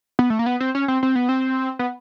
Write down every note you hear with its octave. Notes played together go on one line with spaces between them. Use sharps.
B3
A3
A#3
B3
C4
C#4
C4
C4
B3
C4
B3